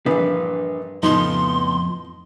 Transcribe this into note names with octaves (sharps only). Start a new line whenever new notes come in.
A#1 G2 E3 D4 B4 F5
F2 A2 C#3 F3 B3 D#4 C6